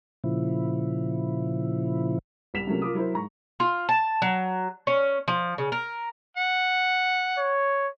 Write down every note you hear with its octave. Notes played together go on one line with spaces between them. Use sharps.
A#2 C#3 F3 E4
C2 G3 B6 E7 F7
C3 F3 F#3 A3 A#3 C#4
F4 A#4 D6 D#6
F#3 E4 A#4 C5
G#2 A#5 C#6
F4
A5
F#3
C#4
F3
C#3
A#4
F#5
C#5